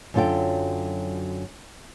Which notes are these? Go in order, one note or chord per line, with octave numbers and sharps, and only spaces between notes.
F#2 D3 F#3 F4 A4 G5